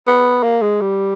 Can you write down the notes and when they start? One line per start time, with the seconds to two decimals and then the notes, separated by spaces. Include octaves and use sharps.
0.07 B3
0.43 A#3
0.62 G#3
0.81 G3